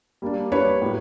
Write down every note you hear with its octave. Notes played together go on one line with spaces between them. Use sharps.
G3 A#3 D4
G3 A#3 D4 B4 C#5
A2 F#3